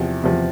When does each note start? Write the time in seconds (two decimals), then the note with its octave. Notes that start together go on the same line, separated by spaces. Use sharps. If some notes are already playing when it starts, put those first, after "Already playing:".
Already playing: E2 C3 F3
0.24 E2 C3 F3